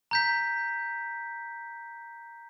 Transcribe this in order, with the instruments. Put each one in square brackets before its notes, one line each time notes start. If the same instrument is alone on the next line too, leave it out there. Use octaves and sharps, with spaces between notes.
[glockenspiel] A#5 G6 B6